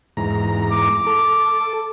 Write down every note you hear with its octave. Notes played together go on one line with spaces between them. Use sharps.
E2 G#2 A#5
D6
A4